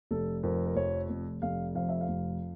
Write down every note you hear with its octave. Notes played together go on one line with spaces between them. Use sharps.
F1 A4
F2 A#4
A#4
F1 C#5
F1
F1 F5
F2 F5
E5
F5
F1